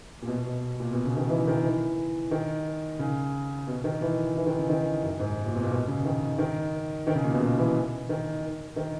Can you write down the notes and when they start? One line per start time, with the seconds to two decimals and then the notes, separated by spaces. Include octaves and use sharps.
0.22 A#2
0.27 B2
0.45 B2
0.80 A#2
0.93 B2
1.05 C#3
1.17 D#3
1.29 E3
1.47 D#3
1.63 E3
2.31 D#3
2.99 C#3
3.67 B2
3.84 D#3
4.01 E3
4.36 E3
4.46 D#3
4.58 C#3
4.69 D#3
5.03 F#2
5.20 G#2
5.46 A#2
5.55 B2
5.63 A#2
5.71 B2
5.87 C#3
6.05 D#3
6.38 D#3
7.07 D#3
7.15 C#3
7.24 A#2
7.33 B2
7.41 C#3
7.58 E3
8.09 D#3
8.76 D#3